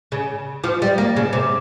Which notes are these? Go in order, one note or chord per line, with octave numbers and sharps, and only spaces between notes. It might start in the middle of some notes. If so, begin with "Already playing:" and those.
C#3
F3
G3
A#3
C#3
C3